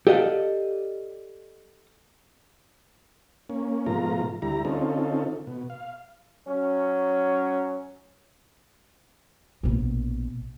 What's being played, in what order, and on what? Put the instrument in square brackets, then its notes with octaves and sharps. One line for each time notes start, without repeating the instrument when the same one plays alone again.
[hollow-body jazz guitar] G4 A4 D5 D#5 F5 F#5
[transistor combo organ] A#3 C#4
G#2 B2 F3 A3 F4 A#5
D2 G3 E4 A#5
D3 C4 C#4 D#4 F4 A4
B2
F5
[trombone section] F#3 C#4
[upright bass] A#1 B2